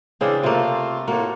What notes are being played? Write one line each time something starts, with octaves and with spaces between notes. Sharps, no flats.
C#3 E3 C4 D4 G#4
C3 A3 A#3 C4 F4
A2 A#3 F4 F#4